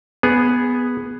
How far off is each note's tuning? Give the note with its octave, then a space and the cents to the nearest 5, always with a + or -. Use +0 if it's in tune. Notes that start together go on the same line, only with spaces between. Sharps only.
B3 +0 G#4 +0